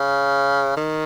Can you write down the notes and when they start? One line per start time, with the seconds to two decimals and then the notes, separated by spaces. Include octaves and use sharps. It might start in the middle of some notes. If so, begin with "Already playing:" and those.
Already playing: C#3
0.77 D#3